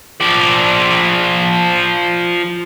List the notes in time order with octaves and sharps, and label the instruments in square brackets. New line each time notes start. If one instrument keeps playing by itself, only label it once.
[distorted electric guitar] F3 D5